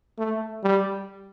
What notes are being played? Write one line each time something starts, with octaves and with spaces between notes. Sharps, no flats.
A3
G3